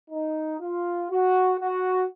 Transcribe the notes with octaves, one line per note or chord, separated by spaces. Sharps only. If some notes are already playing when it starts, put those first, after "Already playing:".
D#4
F4
F#4
F#4